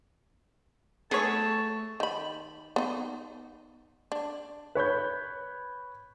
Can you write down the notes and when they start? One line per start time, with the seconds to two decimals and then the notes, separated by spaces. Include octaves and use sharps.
1.11 F#3 A3 B3 G#4 C#5 A5
2.00 D#3 B5
2.76 B3 D#4
4.12 D4
4.75 B4 C#5 B5 G6